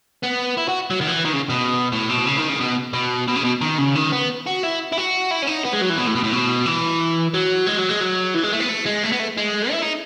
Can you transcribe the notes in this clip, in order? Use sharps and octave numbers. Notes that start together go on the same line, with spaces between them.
B3
E4
F#4
F#3
D#3
E3
D#3
C#3
B2
A2
B2
C#3
D#3
C#3
B2
B2
B2
C#3
B2
D#3
C#3
D#3
B3
F#4
E4
E4
F#4
E4
C#4
D#4
B3
G#3
F#3
E3
B2
A2
B2
A2
B2
E3
F#3
G#3
F#3
G#3
F#3
E3
G#3
A3
B3
A3
G#3
A3
B3
A3
G#3
E4
D#4